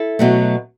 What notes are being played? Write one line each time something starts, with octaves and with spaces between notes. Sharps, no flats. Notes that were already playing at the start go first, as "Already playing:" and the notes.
Already playing: E4 A4
B2 F#3 A3